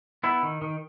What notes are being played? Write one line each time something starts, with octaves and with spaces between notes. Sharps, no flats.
B3 E4
D#3
D#3